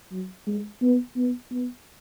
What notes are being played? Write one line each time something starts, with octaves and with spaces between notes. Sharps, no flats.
F#3
G#3
B3
B3
B3